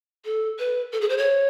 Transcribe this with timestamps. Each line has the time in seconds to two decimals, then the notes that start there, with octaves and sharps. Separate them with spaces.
0.25 A4
0.59 B4
0.92 A4
1.01 G#4
1.09 C5
1.18 C#5